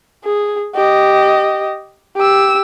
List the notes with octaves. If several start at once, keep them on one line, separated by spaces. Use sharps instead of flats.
G#4
G4 D#5
G4 E6